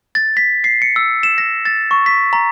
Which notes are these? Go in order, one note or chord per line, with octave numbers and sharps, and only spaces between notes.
A6
B6
C7
C#7
E6
E7
A#6
A6
C#6
B6
A#5